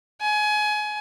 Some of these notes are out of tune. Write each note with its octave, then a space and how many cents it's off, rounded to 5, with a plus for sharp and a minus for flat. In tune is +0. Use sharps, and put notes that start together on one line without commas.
G#5 +25